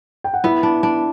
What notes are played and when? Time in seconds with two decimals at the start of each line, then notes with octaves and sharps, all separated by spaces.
0.24 G5
0.34 F#5
0.44 B3 E4 E5
0.63 D4
0.83 D4